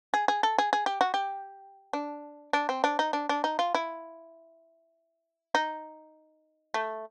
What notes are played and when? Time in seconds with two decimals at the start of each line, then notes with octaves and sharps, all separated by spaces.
0.14 G#4
0.28 G#4
0.43 A4
0.58 G#4
0.73 G#4
0.86 G4
1.01 F#4
1.14 G4
1.93 D4
2.53 D4
2.69 C4
2.84 D4
2.99 D#4
3.13 D4
3.29 D4
3.44 D#4
3.59 F4
3.75 E4
5.55 D#4
6.74 A3